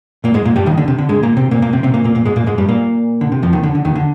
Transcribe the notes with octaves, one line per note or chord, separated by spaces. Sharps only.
A#2 A#3
G#2 G#3
A#2 A#3
G2 G3
D#2 D#3
D3
C3
D3
G#2 G#3
A#2 A#3
C3 C4
A#2 A#3
A#2 A#3
C3 C4
C3 C4
A#2 A#3
A#2 A#3
A#2 A#3
G#2 G#3
A#2 A#3
G#2 G#3
G2 G3
A#2 A#3
D3
C3
F2 F3
D#2 D#3
D3
D3
D#2 D#3
D3